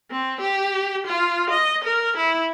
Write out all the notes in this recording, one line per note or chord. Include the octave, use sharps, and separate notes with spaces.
C4
G4
F4
D#5
A#4
E4